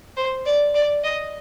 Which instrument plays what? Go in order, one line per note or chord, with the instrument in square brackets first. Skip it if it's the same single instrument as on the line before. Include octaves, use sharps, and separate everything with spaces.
[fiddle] C5
D5
D5
D#5